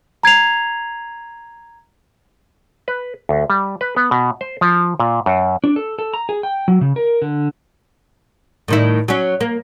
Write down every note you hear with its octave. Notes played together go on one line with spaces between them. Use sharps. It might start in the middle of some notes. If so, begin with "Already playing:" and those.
A#5 G#6 C7 F7
B4
D2
G3
B4
B3
B2
C5
F3
A#2
F#2
D4
A4
A4
A#5
G#4
G5
F#3
C#3
A#4
D3
A2 D#3 E4
F#3 C#4
A#3